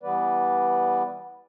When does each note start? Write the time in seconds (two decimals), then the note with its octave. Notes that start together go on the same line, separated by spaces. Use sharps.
0.03 E3 G3 B3 B4 D5